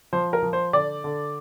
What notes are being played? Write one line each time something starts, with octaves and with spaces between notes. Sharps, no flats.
F3 C5
A#4
F3
C5
D3 D5
D3